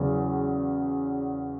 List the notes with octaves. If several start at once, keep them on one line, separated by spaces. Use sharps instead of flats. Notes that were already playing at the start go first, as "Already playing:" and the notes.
Already playing: E2 C#3 F#3